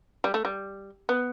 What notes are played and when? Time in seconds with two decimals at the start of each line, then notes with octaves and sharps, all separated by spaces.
0.24 G3
0.34 A3
0.45 G3
1.09 B3